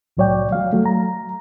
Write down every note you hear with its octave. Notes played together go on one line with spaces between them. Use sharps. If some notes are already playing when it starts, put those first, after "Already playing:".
C2 A2 F#3 C#5 D5 G5
F#3 F5
F#3 A3
A#5